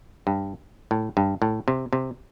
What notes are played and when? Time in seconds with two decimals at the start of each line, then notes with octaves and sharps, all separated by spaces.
0.27 G2
0.91 A2
1.17 G2
1.42 A2
1.68 C3
1.93 C3